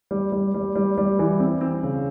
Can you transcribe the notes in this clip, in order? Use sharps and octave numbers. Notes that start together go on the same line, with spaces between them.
G3
G3
G3
G3
G3
E3
C4
C4
C#3